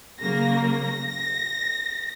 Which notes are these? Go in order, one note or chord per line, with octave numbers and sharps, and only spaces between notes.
C#3 F#3 A#3 A#6
A#6